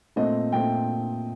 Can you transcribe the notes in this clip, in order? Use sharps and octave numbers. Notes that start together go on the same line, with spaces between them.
A#2 A3 C4 D#5
A#2 A3 C4 G5